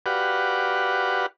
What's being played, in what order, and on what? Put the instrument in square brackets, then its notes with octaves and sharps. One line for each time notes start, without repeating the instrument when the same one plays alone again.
[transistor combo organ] F#4 G4 B4 D5 F5 F#5